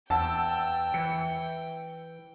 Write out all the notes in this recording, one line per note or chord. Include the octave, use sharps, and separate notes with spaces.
E2 F#5 G5 A5 E6
E3 C#7